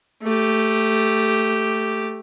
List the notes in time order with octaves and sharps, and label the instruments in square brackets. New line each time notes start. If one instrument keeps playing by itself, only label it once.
[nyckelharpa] A3 G4